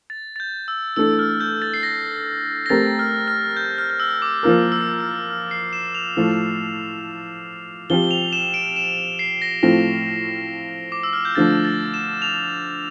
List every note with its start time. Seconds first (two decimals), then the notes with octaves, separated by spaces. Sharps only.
0.10 A6
0.36 A6
0.40 G6
0.68 E6
0.96 E3 A3 D4 A4 E6
1.19 F6
1.40 G6
1.62 A6
1.74 C7
1.83 A#6
2.66 A#6
2.70 A3 C4 G4 A#4 A6
2.99 F6
3.28 F6
3.57 G6
3.78 F6
3.90 F6
4.00 E6
4.22 D6
4.43 F3 A#3 F4 A#4 F6
4.72 E6
5.00 F6
5.30 F6
5.51 C7
5.73 E7
5.95 F7
6.16 A2 F3 A3
7.90 F3 C4 G4 G7
8.11 F7
8.33 E7
8.54 D7
8.76 E7
9.19 C7
9.42 A#6
9.63 A2 F3 A3 C4 F4 A#6
10.92 D6
11.03 E6
11.13 F6
11.25 G6
11.35 D3 F3 A3 D4 A6
11.64 A6
11.94 E7
12.22 F7